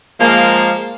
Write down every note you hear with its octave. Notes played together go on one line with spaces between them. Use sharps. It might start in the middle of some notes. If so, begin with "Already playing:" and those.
F3 G#3 A#3